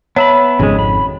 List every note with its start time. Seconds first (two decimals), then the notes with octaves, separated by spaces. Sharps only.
0.16 B3 C#5 E5 B5
0.59 G#1 F2 C#3 G#3
0.79 B5